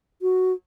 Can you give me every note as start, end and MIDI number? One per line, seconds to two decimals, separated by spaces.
0.22 0.53 66